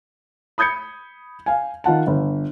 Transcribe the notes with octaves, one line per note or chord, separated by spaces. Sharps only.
B5 D#6 G6 G#6 C#7
F5 G#5
D#3 F4 F#5 A5
G1